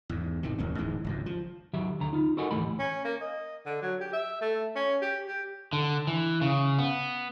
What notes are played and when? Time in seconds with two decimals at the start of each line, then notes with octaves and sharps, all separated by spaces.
0.09 E2 G#2
0.43 G#1 C3 D#3
0.58 A1 D#2 A#3 C#4
0.78 D1 G#2 E3 G#3
1.04 G#1 C#2 F#2
1.26 F3
1.73 D#3 F#3 G4 E5
2.00 D2 D3 A#5
2.13 D#4 F4
2.37 F#4 A4 A#4 D#5 F#5 G#5
2.51 D2 A2 E3 A3 G4 B5
2.79 C#4
3.04 A#3
3.21 D#5
3.65 D3
3.82 F#3
4.01 G4
4.13 E5
4.41 A3
4.76 C#4
5.02 G4
5.28 G4
5.73 D3
6.07 E3
6.41 C#3
6.79 B3